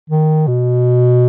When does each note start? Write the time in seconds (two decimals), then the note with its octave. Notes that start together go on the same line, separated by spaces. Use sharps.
0.10 D#3
0.47 B2